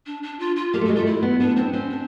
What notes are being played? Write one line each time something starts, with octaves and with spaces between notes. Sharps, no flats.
D4
D4
F4
F4
A#3 G4
A3
G#3 F#4
A3 F4
E4
B3
B3 D4
C4 D4
C4 C#4
D4